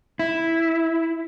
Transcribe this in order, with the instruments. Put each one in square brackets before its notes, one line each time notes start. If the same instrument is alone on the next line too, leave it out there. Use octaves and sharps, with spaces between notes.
[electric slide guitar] E4